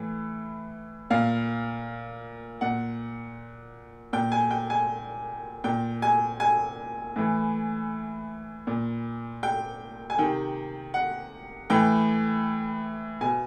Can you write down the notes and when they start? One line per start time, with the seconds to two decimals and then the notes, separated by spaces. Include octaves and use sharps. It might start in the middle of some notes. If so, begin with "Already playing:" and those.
Already playing: A2 E3
1.10 A#2 F5
2.61 A#2 F#5
4.13 A#2 G5
4.32 G#5
4.51 G5
4.70 G#5
5.64 A#2 G5
6.02 G#5
6.40 G#5
7.16 A2 E3
8.67 A#2
9.43 G5
10.10 G#5
10.18 C3 D#3 G5
10.94 F#5
11.70 A2 E3 G5
13.21 B2 G#5